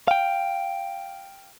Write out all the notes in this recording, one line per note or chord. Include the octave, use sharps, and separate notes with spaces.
F5 G5